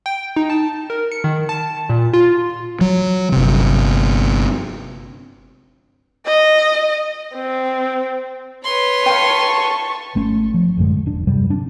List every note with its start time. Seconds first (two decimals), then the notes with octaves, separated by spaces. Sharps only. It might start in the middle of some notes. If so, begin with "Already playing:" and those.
0.06 G5
0.36 D#4
0.50 A5
0.90 A#4
1.12 C#7
1.24 D#3
1.49 A5
1.89 A#2
2.13 F4
2.81 F#3
3.32 G1 C3
6.27 D#5
7.35 C4
8.64 B4 C#5 C6
9.06 F5 G5 A5 C#6
10.15 G#1 A3 C#4
10.54 F3
10.77 A1 F#2 D3 G#3
11.06 E1 D4
11.27 G2 C3 F#3 G3
11.50 C4 D4